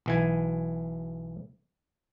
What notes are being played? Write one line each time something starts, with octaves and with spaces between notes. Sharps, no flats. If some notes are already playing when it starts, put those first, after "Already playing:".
B1 E3 G#5